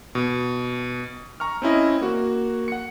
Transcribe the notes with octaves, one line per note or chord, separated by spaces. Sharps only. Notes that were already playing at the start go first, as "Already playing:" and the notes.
B2
A#5 C#6 F6
C4 C#4 E4 D#5
A#3 F#4
F#5 C#7